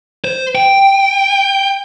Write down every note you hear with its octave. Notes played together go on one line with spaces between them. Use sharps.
C5
G5